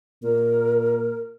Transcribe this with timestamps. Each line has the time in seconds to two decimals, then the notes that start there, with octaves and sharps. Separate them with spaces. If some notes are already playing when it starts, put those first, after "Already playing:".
0.23 A#2 A#4